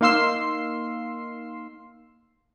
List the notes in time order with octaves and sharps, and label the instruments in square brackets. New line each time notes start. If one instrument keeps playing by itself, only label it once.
[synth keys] A#3 D#4 F5 C6 E6 C7